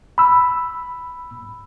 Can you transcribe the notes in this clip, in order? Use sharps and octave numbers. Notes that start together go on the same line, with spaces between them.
B5 E6